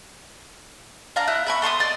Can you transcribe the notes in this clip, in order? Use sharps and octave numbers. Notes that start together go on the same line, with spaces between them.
D4 F5 A#5
E4 F#6
E5 B5 C#6
A4 C6 C#6 D#6
D5 D#5